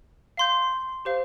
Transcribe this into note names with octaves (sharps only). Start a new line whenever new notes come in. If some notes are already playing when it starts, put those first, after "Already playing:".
F5 C6 G6
G4 C5 F5